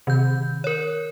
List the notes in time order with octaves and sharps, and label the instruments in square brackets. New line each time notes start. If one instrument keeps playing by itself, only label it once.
[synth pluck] C3 [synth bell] D#3 G6
[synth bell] A#4 C#5